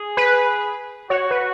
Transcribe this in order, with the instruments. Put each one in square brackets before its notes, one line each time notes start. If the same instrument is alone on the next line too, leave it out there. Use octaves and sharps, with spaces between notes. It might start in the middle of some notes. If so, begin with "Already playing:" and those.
Already playing: [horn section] G#4
[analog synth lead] B4
[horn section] F#4 [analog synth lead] C#5
[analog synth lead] B4